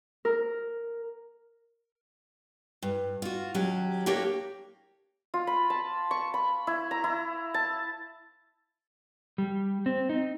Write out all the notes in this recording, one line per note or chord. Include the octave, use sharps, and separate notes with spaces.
A#4
G2
F4 F#4
D#2 F#3 C#4 G4
A#3 D4 G4 A4 A#4 C#5
F4
B5
A5
C#6
B5
E4
A#5
E4
A5
G3
C4
D#4